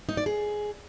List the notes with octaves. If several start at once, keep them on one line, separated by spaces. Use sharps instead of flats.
D#4
D5
G#4